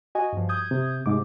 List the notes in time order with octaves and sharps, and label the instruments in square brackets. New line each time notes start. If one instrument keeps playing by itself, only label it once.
[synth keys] F#4 D#5 G#5
G2 F3
D#6 G6 G#6
[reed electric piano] C3
[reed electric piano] G#2 D6 [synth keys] C3